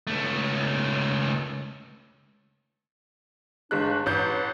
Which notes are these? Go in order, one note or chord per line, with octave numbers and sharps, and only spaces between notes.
C#2 A3
G1 G#3 D4 F#6
A1 B4 G6